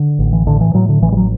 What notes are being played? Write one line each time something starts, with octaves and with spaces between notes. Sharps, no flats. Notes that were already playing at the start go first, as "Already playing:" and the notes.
Already playing: D3
A1
E3
A2 D3
E3
A2 F#3
D3
A1 E3
G3
F#3